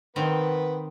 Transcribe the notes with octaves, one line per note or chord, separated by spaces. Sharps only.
D#3 B3 C4 B4